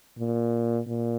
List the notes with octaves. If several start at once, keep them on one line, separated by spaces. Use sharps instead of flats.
A#2
A#2